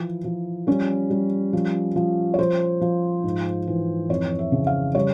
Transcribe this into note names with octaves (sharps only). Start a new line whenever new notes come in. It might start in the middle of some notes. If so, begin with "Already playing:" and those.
Already playing: E3 F3 E4
F3
G3 C#4
G3
F3
F3
C#5
F3 C5
F3
G#2
E3
F2 C#5
E5
C#3
F5
G3 C#5